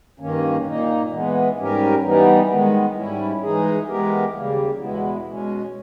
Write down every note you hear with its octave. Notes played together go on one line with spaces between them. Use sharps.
G2 D#3 A#3 C#4
A#2 A#3 D#4
E3 G#3 B3
G#2 G3 C#4 G4 A#4
E3 G3 B3 D#4
D#3 G#3 B3
G#2 G3 C#4 E4
E3 G#3 D#4 G#4
E3 G#3 B3 G4 A#4
D#2 C#3 G3 A#3
E2 B2 G#3 B3 E4
B2 G#3 C#4